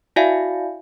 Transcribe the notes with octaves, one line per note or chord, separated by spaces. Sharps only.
E4 F#4 D5 E5 F5 G#5